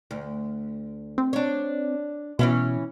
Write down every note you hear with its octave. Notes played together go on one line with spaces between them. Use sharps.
D2
C4
D4 C#5
B2 E3 C#4 E4